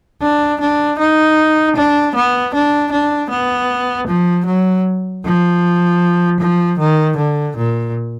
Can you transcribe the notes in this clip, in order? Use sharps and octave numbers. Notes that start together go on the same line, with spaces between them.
D4
D4
D#4
D4
B3
D4
D4
B3
F3
F#3
F3
F3
D#3
D3
A#2